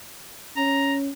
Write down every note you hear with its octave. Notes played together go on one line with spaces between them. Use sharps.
C#4 A#5